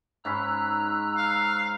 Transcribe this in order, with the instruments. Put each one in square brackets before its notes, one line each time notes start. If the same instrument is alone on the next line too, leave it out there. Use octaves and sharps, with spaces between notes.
[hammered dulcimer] G#2 C#4 B5 [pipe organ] A#5 E6 F#6
[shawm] F5